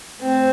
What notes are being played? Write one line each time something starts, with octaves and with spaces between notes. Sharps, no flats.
A2 C4